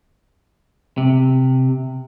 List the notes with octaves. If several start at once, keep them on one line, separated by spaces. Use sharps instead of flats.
C3